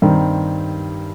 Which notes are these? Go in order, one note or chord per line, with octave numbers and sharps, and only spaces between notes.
G2 D#3 G3 C4